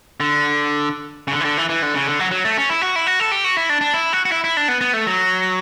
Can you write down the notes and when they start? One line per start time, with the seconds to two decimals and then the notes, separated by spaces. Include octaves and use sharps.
0.20 D3
1.28 C#3
1.32 D3
1.40 E3
1.45 D3
1.58 E3
1.69 E3
1.82 D3
1.95 C#3
2.06 D3
2.20 F#3
2.31 F#3
2.45 A3
2.57 C#4
2.70 E4
2.82 F#4
2.96 E4
3.07 F#4
3.20 A4
3.31 G4
3.44 F#4
3.57 E4
3.69 D4
3.81 D4
3.94 E4
4.13 F#4
4.25 F#4
4.32 E4
4.44 E4
4.57 D4
4.68 B3
4.81 B3
4.93 A3
5.07 F#3